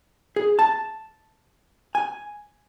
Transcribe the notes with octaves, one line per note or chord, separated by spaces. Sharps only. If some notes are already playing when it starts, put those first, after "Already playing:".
G#4
A5
G#5